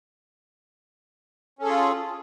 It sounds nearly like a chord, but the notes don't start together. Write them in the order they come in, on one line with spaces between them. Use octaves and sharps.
C#4 A4 G#4 F4